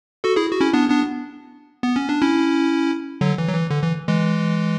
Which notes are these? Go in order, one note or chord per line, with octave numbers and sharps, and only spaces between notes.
F#4 A4
E4 G#4
F#4
C#4 E4
B3 D4
B3 D4
B3
C#4
D4
C#4 E4
D3 F#3
E3
F#3
E3
D3
E3
E3 G#3